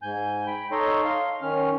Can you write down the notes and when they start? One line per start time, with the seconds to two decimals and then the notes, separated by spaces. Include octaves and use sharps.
0.02 G#2 G#5 G6
0.47 G5 B5
0.72 D#4 A4 C#5 D#5 C6
1.05 F5 C6
1.42 D#3 C#4 F6